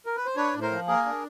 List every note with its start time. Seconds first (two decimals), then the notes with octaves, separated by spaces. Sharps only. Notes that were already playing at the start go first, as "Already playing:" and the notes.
0.06 A#4
0.17 B4
0.26 C5
0.36 D4 B4 C#5
0.54 A2
0.62 A#4 C5
0.72 F3
0.87 A#3 G#4 A#4
1.06 D4